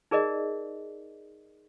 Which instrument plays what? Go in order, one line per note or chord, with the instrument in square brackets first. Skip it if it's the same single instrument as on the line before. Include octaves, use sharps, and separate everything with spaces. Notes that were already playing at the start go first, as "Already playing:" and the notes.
[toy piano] D#4 G#4 A#4 D5 D#5